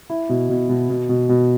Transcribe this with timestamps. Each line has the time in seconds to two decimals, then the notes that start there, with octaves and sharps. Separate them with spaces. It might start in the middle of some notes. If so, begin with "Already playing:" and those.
0.10 E4
0.29 B2
0.49 B2
0.69 B2
0.89 B2
1.09 B2
1.29 B2